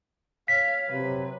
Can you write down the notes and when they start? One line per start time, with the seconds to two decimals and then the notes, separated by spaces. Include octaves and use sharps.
0.48 C#5 F5 B6
0.89 C3 F#3 B4